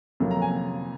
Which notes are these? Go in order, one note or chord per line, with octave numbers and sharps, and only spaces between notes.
F2 C3 F#3 A#3
A#5
G#5